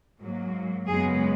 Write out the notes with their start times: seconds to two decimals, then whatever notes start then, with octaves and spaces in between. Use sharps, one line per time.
0.20 G#2 F#3 A#3
0.86 F#2 C#3 G#3 B3 G#4